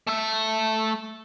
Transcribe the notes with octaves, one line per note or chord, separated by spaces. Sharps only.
A3 E5